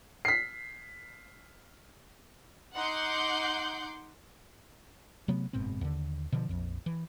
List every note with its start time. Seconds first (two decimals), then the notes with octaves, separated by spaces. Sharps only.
0.25 B6 C7
2.76 D#4 F#5 C6 D6 G6
5.28 C3 F#3 A3 B3
5.53 F#1 G#2 B2 C4
5.81 D#2 D3
6.32 B2 D3 F3
6.49 A#1 F2
6.86 E3